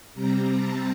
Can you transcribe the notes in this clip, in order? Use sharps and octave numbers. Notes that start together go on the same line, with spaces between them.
C3 G3 C4 A#5
A5